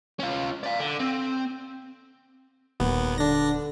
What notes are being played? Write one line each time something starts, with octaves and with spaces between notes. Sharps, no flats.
C#4 F4
D5 F5
D3
C4
D#1 D#2 B3
D3 D4 A#6